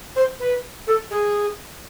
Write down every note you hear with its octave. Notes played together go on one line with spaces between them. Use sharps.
C5
B4
A4
G#4